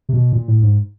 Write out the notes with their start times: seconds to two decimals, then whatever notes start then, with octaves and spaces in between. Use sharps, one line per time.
0.09 C3
0.13 B2
0.33 A#2
0.48 A2
0.62 G#2